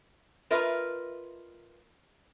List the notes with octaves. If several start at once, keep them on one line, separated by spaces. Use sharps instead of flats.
F4 A#4 B4 D#5 E5